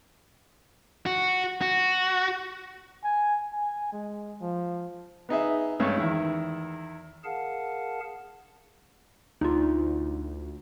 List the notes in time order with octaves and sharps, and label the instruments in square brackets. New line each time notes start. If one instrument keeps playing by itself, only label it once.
[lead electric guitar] F#4
F#4
[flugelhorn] G#5
G#5
G#3
F3
[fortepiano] B3 D#4 G#4 E5
G2 G#3 A3 C#4
E2 D#3 E4
[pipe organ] G#4 A#4 F5 F#5 A5
[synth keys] D2 [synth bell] D#4 F4